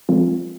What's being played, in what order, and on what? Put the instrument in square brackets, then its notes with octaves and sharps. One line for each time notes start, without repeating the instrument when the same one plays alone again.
[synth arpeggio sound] F3 G#3 C4 F4